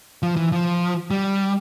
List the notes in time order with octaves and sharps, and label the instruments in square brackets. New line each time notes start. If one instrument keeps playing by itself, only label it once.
[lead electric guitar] F3
E3
F3
G3